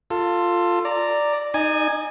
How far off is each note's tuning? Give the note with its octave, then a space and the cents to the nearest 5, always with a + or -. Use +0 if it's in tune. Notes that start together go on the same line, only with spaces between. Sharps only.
F4 +0 A4 +25
D5 +0 A#5 -10
D#4 +0 D5 +40 G#5 +0